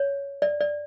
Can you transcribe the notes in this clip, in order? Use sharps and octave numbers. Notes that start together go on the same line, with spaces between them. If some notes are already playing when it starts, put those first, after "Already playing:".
Already playing: C#5
D5
D5